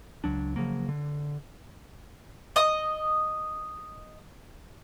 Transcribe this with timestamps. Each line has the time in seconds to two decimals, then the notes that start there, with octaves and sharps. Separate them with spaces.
0.24 C#2 F#2 F#3 D4
0.56 C#3 F3 F#3 A#3
0.89 D3
2.56 D#5 D#6